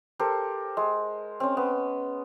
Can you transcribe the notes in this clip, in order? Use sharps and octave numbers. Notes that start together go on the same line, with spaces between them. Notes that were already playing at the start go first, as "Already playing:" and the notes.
G4 A4 A#4 C5
G#3
C4 C#4
B3